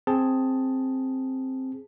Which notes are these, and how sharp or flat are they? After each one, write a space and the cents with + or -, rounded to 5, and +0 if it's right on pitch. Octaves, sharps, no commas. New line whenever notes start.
C4 +5 G#4 +0 A5 +0